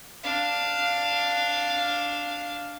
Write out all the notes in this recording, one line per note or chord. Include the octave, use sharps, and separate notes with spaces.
D4 F5